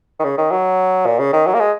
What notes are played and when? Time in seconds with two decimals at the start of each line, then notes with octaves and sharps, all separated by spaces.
0.19 D#3
0.24 C#3
0.38 D#3
0.51 F#3
1.06 A#2
1.19 C#3
1.33 D#3
1.46 F#3
1.54 A#3
1.60 G#3